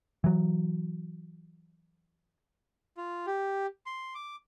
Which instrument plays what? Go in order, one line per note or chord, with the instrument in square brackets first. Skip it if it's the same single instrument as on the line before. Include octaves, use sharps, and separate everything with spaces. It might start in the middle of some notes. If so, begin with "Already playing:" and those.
[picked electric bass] E3 F#3
[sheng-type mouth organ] F4
G4
C6
D6